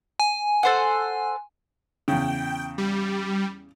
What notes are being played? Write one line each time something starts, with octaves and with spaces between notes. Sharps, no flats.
G#5
A4 C5 F#5
E2 C#3 G5
G3